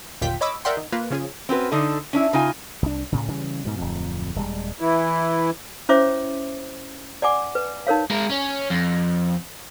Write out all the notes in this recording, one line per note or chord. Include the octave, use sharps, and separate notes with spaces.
G1 D#2 A#2 F4 G5 B6
C#5 D#5 B5 D6 E6
A#4 D5 E5 F#5 G5 C6
D#3
A#3 F4 B4
C#3 F3 C#4 F4 G#4
C4 C#4 F#4 B4
D3 D4 D#4
C#4 D4 E4
C#3 D#4 F4 G#5
C2 D4
D2 A2 C#3
C#3 E3 G3
G#2 B2
D1 F2
D#1 G3 G#3
E3 E4
C#4 E4 C5 C#5 E5 D6
D5 F#5 G#5 D6
B4
D#4 A#4 C#5 F5
G#3 A#4
C#4
F2